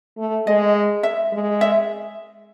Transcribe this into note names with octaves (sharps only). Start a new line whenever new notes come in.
A3
G#3 D#5
E5
G#3
E5